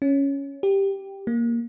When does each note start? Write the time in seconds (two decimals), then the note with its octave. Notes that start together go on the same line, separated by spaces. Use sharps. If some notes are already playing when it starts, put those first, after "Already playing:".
0.02 C#4
0.63 G4
1.27 A#3